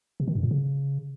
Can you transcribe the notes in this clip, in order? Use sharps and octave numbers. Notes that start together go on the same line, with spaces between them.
C3
D#3
G2
A#2
C#3